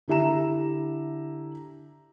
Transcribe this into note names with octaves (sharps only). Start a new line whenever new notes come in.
D3 E4 G4 E5 A#5 E7